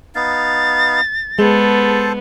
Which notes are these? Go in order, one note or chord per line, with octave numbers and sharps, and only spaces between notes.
B3 D#4 F5 A6
G#3 B3 A4 C5 A5